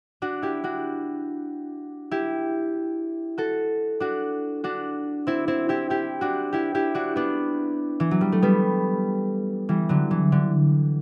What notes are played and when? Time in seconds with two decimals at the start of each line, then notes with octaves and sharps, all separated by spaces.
0.22 D4 F#4
0.42 E4 G4
0.64 D4 F#4
2.11 E4 G4
3.38 F#4 A4
4.00 D4 F#4
4.64 D4 F#4
5.27 C4 E4
5.48 C4 E4
5.69 E4 G4
5.90 E4 G4
6.21 D4 F#4
6.53 E4 G4
6.75 E4 G4
6.95 D4 F#4
7.16 B3 D4
8.00 E3
8.11 F#3
8.21 G3
8.32 A3
8.42 G3 B3
9.69 E3 G3
9.89 D3 F#3
10.11 E3
10.32 D3